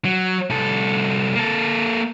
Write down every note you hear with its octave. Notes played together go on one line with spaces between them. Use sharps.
F#3
C2 A4
A#3 A4